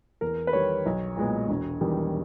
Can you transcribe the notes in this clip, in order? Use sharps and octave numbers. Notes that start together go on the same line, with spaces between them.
E2 A#4
B4
D#3 G3 C#5
B1
A#2 G#3 B3
E1
E2 D#3 G3